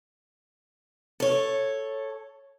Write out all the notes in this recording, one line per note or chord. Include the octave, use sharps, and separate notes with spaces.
A4 C#5